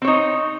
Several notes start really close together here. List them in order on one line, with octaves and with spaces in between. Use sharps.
C4 C#5 D#4